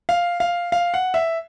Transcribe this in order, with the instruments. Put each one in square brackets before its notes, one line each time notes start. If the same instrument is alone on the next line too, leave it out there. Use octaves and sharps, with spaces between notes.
[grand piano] F5
F5
F5
F#5
E5